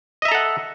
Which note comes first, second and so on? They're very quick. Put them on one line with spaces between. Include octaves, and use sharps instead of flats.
D#5 E5 A#5 A4 F#5